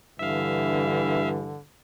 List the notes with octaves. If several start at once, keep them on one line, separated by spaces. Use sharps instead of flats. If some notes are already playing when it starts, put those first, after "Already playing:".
G2 D3 E3 E5 F5